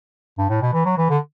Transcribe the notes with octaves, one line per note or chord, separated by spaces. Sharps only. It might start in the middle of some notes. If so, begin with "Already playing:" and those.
G2
A2
B2
E3
F#3
E3
D3